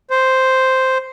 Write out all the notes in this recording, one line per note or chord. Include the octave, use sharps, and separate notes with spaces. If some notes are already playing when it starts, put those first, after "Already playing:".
C5